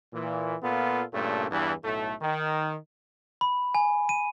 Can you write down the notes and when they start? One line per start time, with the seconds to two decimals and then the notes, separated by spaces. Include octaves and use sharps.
0.13 A#2 E3
0.63 A#2 B3 F4 A4
1.14 G2 A#2 C#3 A3
1.51 E2 G2 E3
1.84 B1 A2 A3
2.21 D#3
3.41 B5
3.75 G#5
4.09 D#7